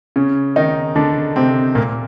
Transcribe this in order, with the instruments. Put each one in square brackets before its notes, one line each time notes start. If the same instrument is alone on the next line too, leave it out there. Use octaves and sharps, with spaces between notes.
[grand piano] C#3 C#4
D#3 D#4
D3 D4
C3 C4
A#2 A#3